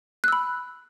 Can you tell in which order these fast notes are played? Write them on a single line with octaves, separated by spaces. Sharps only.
F#6 E6 B5